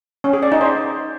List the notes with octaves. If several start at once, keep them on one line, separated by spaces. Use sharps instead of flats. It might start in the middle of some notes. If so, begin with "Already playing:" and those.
C#4
G#4
D5
D#4
C5